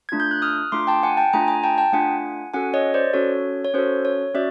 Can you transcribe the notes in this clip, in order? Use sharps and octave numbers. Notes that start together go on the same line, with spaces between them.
A3 D4 F4 G#6
G6
F#6
D#6 F6
A3 D4 F4 C6 D6
G5 A5
F#5 G#5
G5 A5
A3 D4 F4 G#5 A#5
G#5 A#5
G5 A5
G5 A5
A3 D4 F4 F#5 G#5
C#4 F#4 A4 F#5 G#5
C#5 D#5
C5 D5
C#4 F#4 A4 C#5
C#5
C#4 F#4 A4 C5
C#5
C#4 F#4 D5 E5